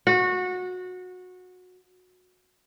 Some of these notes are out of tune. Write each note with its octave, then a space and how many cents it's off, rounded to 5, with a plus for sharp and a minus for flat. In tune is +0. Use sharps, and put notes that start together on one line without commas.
F#4 -20